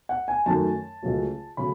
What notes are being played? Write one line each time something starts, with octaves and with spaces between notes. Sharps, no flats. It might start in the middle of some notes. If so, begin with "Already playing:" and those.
F#5
G#5
F#2 D#3 A3 A5
C#2 C#3 F#3 A3
C#3 F#3 A3 B5